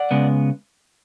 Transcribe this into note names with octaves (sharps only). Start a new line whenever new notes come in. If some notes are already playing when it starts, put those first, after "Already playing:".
Already playing: D5 F#5
C#3 G#3 B3